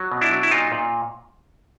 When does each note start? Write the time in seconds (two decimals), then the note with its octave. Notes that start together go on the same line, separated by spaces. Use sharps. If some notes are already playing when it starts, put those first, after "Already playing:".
Already playing: F#3
0.11 B2
0.21 D4 E4
0.32 F#3
0.43 E4
0.51 A#2 D#4 F4
0.72 A#2